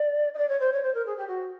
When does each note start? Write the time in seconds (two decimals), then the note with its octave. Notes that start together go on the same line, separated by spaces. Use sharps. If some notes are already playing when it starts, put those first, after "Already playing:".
Already playing: D5
0.33 D#5
0.38 D5
0.48 C#5
0.59 C5
0.72 C#5
0.82 C5
0.94 A#4
1.05 G#4
1.17 G4
1.27 F#4